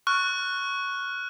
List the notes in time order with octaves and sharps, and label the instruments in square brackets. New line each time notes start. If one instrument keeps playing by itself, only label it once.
[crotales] C#6 F6 F#6